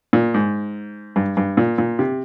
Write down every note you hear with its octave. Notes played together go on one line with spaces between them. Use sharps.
A#2
G#2
G2
G2
A#2
A#2
C3